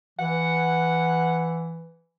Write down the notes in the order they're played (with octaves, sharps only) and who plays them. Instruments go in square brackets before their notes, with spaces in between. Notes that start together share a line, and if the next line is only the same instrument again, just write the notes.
[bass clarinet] E3 [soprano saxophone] F#5